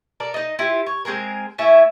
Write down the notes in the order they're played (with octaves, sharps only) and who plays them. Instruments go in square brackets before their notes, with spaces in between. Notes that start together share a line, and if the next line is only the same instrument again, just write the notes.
[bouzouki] A4 A#4 D5
D#4 D#5
E4 F4 G4
C#5
G#3 C4 G#4 A#4
A3 C#4 E4 E5